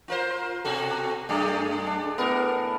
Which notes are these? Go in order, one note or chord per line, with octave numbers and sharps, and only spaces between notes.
F4 A#4 C5
B2 F#4 A4
F#2 A3 G#4 D5 G5
D4
A2 B3 A#4